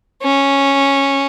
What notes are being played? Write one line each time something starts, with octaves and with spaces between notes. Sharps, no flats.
C#4